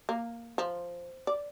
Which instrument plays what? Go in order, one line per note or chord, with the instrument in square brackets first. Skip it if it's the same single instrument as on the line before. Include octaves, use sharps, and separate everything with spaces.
[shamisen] A#3
F3
D5